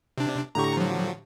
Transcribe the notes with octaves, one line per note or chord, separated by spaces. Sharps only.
C3 D4
A2 D3 G4 A#5 C#6
F3 F#3